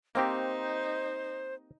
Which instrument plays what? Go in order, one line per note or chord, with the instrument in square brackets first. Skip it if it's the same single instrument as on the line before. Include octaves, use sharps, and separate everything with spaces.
[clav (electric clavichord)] A#3 C4 G4 [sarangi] D#4 [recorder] C5